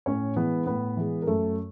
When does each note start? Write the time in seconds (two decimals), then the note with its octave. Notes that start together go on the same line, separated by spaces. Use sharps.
0.06 A2 C#4 C#5
0.36 E3 G#3 B3 B4
0.66 A2 B3 B4
0.97 E3 G#3
1.22 A#4
1.27 F#2 A3 A4